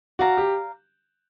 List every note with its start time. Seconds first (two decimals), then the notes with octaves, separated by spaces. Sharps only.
0.19 F#4 D5 F5 A#5
0.37 G4